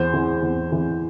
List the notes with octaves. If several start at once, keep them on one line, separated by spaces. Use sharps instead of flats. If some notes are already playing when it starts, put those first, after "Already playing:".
Already playing: E2 C5
E3
E2
E3